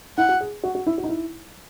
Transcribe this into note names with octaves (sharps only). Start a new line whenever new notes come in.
E4 F#5
F#4
G#4
F#4
F#4
E4
F#4
D#4
E4